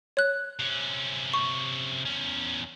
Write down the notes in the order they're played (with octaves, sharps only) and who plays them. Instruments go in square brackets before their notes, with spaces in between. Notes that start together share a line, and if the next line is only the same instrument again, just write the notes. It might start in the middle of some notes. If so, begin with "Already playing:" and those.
[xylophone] C#5 F#6
[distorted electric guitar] C3 C#4
[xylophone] C#6
[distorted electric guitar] E2 C#4